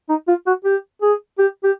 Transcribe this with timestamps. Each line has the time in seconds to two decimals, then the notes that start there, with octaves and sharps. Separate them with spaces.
0.09 D#4
0.28 F4
0.47 F#4
0.65 G4
1.02 G#4
1.39 G4
1.64 G4